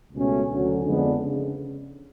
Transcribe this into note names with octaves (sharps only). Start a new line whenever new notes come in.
C#2 B2 A3 C#4
D2 D3 F#3 C#4
F2 D3 G#3 B3 D4
C#3